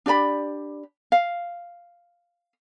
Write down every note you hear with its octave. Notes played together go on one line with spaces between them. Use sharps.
D4 G4 D5 B5
F5